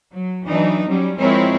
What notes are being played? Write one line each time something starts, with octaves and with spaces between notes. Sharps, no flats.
F#3
E3 F#3 D4 D#4
F#3 G3 C#4
F3 G#3 C4 E4 A#4 C#5